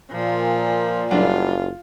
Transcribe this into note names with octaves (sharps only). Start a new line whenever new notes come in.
A#2 F3
F#1 F#3 G3 D4 F4